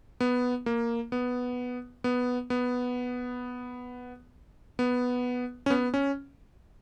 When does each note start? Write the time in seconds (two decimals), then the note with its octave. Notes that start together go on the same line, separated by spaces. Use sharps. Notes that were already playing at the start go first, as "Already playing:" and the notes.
0.20 B3
0.66 A#3
1.12 B3
2.04 B3
2.50 B3
4.79 B3
5.66 C#4
5.70 B3
5.94 C#4